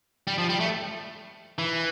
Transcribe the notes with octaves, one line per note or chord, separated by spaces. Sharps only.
G3
F3
G3
A3
E3